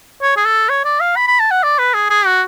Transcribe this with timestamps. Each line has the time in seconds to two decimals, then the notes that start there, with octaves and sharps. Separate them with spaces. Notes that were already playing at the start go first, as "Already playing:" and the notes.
0.22 C#5
0.37 G#4
0.46 A4
0.69 C#5
0.85 D5
1.01 F5
1.16 B5
1.28 B5
1.40 A5
1.51 F#5
1.63 D5
1.79 B4
1.94 G#4
2.10 G#4
2.26 F#4